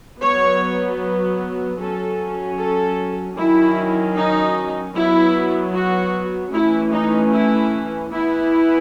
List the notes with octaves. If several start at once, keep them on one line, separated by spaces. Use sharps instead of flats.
F#3 B3 C#5
F#3 C#4 A4
A4
D#3 F#3 C#4 E4
D#4
F#3 B3 E4
F#4
E3 A3 C#4 E4
D#4
E4
E3 B3 E4